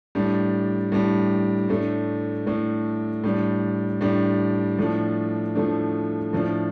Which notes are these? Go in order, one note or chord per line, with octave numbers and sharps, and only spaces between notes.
A2 G3 D4
A2 G3 D4
A2 A3 D4
A2 A3 D4
A2 G3 D4
A2 G3 D4
A2 F3 A3 D4
A2 F3 A3 D4
A2 F3 D4